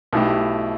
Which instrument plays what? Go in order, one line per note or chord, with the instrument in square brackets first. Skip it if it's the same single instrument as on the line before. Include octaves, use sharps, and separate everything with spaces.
[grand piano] B1 B2 A3 E4 G4